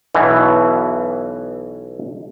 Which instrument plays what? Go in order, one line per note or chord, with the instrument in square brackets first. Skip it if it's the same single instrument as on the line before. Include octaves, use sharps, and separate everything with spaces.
[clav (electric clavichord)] B1 B2 E3